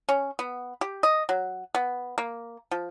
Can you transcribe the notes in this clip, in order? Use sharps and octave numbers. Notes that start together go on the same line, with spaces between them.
C#4
B3
G4
D#5
F#3
B3
A#3
F3